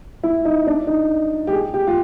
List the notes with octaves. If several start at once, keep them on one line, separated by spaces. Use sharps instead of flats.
E4
D#4
D4
D#4
G4
G#4
G4
F4